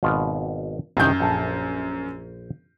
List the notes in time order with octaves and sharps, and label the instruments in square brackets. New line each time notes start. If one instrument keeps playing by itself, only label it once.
[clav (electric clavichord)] G#1 B2 F4
[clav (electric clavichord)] C2 D#3 [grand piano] F#2 G6
[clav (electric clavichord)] A#1 A4 G#5